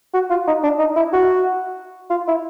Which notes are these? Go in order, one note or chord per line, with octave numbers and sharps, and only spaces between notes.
F#4
F4
D#4
D4
D#4
E4
F#4
F4
E4